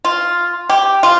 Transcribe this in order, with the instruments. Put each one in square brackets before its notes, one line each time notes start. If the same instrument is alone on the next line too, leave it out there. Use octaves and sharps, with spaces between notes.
[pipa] F4
G4
F4